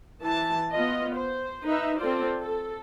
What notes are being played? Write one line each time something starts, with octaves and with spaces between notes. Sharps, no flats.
E3 A5
B3 F4 D#5
C5
D#4 B4 E5
C4 F4 A4 C5 D5
A4